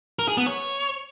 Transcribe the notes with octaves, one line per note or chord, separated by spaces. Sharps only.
A#4
G#4
B3
C#5